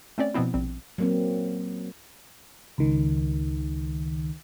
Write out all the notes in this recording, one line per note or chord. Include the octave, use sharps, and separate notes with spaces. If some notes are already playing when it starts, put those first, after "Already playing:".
A3 C4 C#4 D5
B2 F3 B3 C4 E4
A#1 G3 C4
F#3 A#3 C4
C#2 D#3